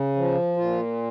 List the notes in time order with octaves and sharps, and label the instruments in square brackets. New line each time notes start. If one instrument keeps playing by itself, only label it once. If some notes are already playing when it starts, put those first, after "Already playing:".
Already playing: [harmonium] C#3
F3
A#2 F4